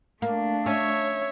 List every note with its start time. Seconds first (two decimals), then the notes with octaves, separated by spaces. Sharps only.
0.22 A3 A#3 D4
0.66 C#4 C#5 E5